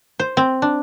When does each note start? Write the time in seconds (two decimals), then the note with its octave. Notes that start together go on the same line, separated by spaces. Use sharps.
0.19 C5
0.37 C4
0.62 D4